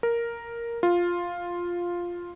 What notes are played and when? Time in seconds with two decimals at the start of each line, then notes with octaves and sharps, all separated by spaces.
0.03 A#4
0.83 F4